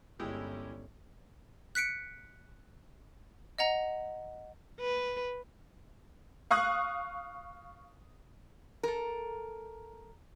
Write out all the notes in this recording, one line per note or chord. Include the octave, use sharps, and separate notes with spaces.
G1 G#3 C#4 E4 G4
F#6 B6 C#7 D7
D#5 F#5 A#5
B4
F5 C#6 D#6 F#6
A4 A#4